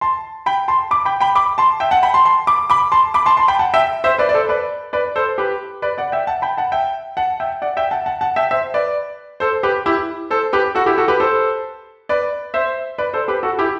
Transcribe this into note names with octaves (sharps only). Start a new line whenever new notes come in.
A5 C6
G5 B5
A5 C6
B5 D6
G5 B5
G5 B5
B5 D6
A5 C6
E5 G5
F#5 A5
G5 B5
A5 C6
A5 C6
B5 D6
B5 D6
A5 C6
B5 D6
A5 C6
A5 C6
G5 B5
F#5 A5
E5 G5
C5 E5
B4 D5
D5
A4 C5
B4 D5
B4 D5
A4 C5
G4 B4
B4 D5
D5 F#5
E5 G5
F#5 A5
G5 B5
F#5 A5
E5 G5
F#5 A5
E5 G5
D5 F#5
E5 G5
F#5 A5
F#5 A5
F#5 A5
E5 G5
C5 E5
B4 D5
A4 C5
G4 B4
E4 G4
A4 C5
G4 B4
F#4 A4
E4 G4
F#4 A4
G4 B4
A4 C5
B4 D5
C5 E5
B4 D5
A4 C5
G4 B4
F#4 A4
E4 G4